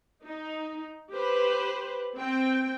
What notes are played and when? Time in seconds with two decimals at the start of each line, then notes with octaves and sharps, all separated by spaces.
0.24 D#4
1.12 G4 B4 C5
2.16 C4 G5